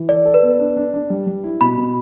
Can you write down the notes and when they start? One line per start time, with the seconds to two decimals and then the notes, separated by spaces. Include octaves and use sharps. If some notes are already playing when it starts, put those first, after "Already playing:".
Already playing: E3
0.09 A4 D5
0.25 A4
0.34 B4
0.43 B3
0.59 D4
0.77 D4
0.94 D4
1.10 G3
1.27 G3
1.44 E4
1.61 B2 B5
1.78 B2